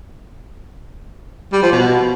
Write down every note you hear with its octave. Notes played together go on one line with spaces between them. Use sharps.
G3
F3
B2